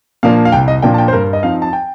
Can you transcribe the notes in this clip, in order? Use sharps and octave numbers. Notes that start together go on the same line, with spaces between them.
A#2 F3 A#3 D4 F5
F5
C2 G5
D#5
A#2 F3 A#3 D4 G5
A5
G5
C5
G2 A#4
D#5
F3 C4 D#4 F5
A5
G5